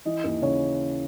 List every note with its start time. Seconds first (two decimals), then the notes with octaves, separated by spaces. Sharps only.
0.05 E3 D#5
0.24 D#2
0.42 C#3 C#5